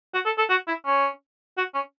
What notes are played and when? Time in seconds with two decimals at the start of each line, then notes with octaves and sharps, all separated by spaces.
0.14 F#4
0.26 A4
0.38 A4
0.50 F#4
0.68 E4
0.86 C#4
1.57 F#4
1.75 C#4